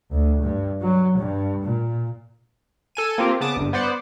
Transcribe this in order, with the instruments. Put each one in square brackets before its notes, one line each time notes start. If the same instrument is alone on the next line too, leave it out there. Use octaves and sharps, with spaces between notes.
[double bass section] D2
G2
F#3
G2
A#2
[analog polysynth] A4 G#5 D#7
A#3 C4 F4 G4
C#3 B3 A5 D6 D#6
G1 G2
B3 C5 D5 F#5